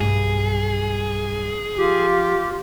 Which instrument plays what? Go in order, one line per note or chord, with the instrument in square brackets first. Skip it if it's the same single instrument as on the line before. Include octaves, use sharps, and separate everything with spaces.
[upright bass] B1 G2 [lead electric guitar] G#4
[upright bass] F3 [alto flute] F4 [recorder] G4